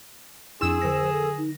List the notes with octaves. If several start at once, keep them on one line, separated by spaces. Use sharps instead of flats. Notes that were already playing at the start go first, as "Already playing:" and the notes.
F2 D4 E4 G#4 E6 E7
D3 C5 A#6
A4
D#4